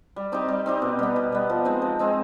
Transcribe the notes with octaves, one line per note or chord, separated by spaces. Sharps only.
G3
C4 D#4 G4
G3
C4 D#4 G4
B2
G3 B3
B2
G3 B3
F3
G#3 C4 D#4
F3
G#3 C4 D#4